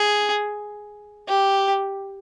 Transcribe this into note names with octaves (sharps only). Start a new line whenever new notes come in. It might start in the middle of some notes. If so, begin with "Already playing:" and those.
Already playing: G#4
G4